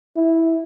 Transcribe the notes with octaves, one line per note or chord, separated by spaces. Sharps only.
E4